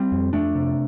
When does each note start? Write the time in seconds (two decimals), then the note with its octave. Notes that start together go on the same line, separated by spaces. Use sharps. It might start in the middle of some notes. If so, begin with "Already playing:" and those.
Already playing: G3 C4
0.12 F2
0.33 F2 A3 D4
0.55 C3